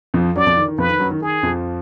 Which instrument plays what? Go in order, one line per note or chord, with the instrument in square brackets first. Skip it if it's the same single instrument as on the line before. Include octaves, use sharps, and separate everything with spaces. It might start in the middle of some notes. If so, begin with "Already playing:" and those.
[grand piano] F2 F3
[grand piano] F#2 F#3 [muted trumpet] D5
[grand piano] F2 F3
D#3
D#3
[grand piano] F2 F3 [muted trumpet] B4
[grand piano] D#3
F#2 F#3
D#3
[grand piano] D#3 [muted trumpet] G#4
[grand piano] F2 F3